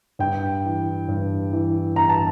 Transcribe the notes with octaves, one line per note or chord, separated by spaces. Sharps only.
G2 G5
E3
G2
E3
G2 A#5
A5